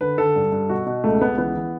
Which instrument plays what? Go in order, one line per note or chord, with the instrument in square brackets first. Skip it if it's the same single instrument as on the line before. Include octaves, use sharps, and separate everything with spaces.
[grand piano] D3 B4
D3 A4
G2
G2
B2 F#4
B2
C#2 A3
C#2 B3
E3 B3
E3